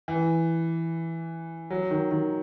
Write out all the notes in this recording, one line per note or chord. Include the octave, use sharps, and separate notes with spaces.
E3
F#3
D#3
D#3